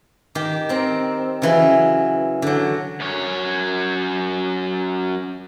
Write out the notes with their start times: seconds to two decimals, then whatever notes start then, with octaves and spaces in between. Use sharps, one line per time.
0.35 D#3 G4
0.69 C4 A#4
1.42 C#3 E3 F#3
2.42 D3 F#3
3.00 F#2 C#5